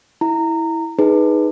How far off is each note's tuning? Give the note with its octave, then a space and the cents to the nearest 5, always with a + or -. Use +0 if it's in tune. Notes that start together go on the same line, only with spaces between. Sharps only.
E4 -10 A#5 -20
D#4 +0 G#4 +0 B4 +0